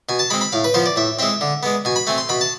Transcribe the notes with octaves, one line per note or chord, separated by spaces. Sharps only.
B2 G#5
A5
G#3 C4 B5
B5
A2 F5
B4
F3 B3 C5
D5
A2 E5
G#3 C4 E5
D3
G#3 B3
B2 G#5
B5
A3 C4 G#5
C6
B2 B5
A5